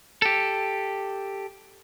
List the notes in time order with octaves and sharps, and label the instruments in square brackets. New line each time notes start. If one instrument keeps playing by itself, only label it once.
[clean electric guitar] G4 A4